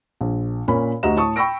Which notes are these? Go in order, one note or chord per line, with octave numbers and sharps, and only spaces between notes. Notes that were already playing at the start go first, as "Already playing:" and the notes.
A#1
A#2 C#4 A#4 B5
D2 F#4 G4 D#5 A#5 E7
A2 A5 C#6 D#6
G5 B5 C#6 E6 A#6 D7